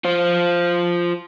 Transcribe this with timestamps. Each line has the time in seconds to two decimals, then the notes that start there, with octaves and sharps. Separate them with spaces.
0.04 F4 C5